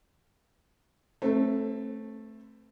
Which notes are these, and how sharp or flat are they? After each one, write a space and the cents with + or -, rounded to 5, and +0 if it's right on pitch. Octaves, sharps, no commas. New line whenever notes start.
A3 +0 C4 +30 B4 +45